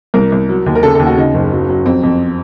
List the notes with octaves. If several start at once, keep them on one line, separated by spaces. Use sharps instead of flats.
C2 A#4
C2
F#3
D#2
A#4
C#3 A4
D#2 A4
F#4
C#3 D#4
F#1
F#3
F#3
F2 C4
F2